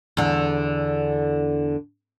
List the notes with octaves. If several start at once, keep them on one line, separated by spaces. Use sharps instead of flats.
E2 D3